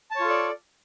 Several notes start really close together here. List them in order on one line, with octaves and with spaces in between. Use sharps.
A5 C#5 F4 A4 D5